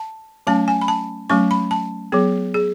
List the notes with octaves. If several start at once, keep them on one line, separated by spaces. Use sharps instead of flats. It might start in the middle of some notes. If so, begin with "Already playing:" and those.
Already playing: A5
F#3 A3 C#4 A5
G#5
B5
A5
F#3 A3 C#4 C#6
B5
A5
F#3 B3 G#4
G#4